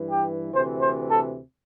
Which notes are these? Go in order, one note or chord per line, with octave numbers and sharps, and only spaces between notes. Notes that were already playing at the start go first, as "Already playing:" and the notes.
Already playing: G2 E3
G4
D2 C3 E3 C5
C5
A4